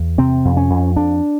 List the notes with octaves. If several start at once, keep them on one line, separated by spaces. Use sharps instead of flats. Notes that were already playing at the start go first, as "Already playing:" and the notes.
Already playing: E2
C3 C4
F2
C#4
F2
F2 D4